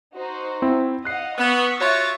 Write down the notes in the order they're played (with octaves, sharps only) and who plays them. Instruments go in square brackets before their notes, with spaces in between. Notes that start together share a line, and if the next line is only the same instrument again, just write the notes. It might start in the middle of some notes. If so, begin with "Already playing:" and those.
[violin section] D#4 F#4 C5
[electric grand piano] C4 E4
[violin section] D#5 F5 F#5 [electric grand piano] F#6 C7
[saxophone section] B3 [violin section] C#6 E6 B6
[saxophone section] F4 F#4 C#5 [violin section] E5 A6